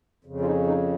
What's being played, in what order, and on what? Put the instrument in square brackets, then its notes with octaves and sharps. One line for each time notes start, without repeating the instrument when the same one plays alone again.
[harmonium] F2 C#3
F4
D#4
D#4